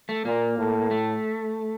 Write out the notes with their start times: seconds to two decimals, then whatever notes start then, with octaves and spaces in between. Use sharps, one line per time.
0.09 A3
0.25 A#2 A#3
0.58 A2
0.91 A3